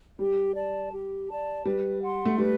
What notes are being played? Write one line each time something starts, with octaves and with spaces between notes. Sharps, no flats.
G3 G4
D5 A5
G4
D5 A5
G3 B4
F#5 C6
A3
G3 B4